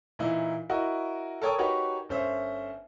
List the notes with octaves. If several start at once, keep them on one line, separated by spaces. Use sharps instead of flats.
A#2 E3 D#4 E4
E4 F#4 A#4 D#5
A4 A#4 C#5 G5 D#6
D#4 F#4 G4 A#4 B4 C#5
G1 C#4 C5 E5